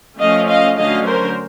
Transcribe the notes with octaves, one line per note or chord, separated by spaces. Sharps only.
F3 A3 C#4 D#5 F5
D#5 F5
D3 F#3 A3 C#4 D#5 F5
A#4 C5